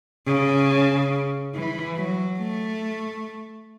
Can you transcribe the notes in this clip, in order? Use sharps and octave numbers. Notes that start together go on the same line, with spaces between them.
C#3
E3
F#3
A3